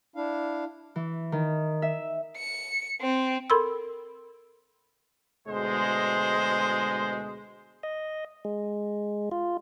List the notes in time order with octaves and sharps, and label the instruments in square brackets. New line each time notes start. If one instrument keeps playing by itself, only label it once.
[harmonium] D4 E4 F5
[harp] E3
D#3
E5
[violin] C#7
C4
[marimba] A4 A#4 B5 C6 E6
[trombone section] D2 B2 G#3 [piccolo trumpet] C5
[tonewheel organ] D#5
G#3
F4